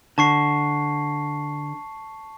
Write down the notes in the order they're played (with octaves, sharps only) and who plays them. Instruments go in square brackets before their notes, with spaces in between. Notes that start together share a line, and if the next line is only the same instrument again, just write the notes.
[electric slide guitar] D3 [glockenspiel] A5 C#6 C7